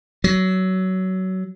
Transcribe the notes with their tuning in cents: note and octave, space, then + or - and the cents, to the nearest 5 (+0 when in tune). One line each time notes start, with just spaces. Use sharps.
F#3 +20